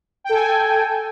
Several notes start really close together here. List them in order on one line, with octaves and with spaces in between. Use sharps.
G5 A4 G#5